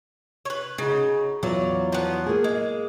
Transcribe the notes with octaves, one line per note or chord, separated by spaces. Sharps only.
B4 C#5
C#3 D#4 F#4
E2 F#3 F4 D5
F3 B3
A#3 G#4
G#3